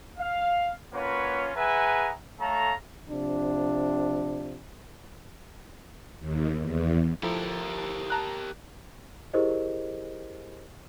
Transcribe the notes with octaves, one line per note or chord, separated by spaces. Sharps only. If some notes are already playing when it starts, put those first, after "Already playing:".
F5
A#3 C#4 F4 F#4 B4 C#5
G#4 B4 E5 F#5 G#5 A#5
A3 A4 C#5 F5 A#5
C3 F3 D4
D#2
E2
F3 E4 G4 A4 A#4
A5 A#5 F#6
E4 G4 G#4 A#4 C5 D#5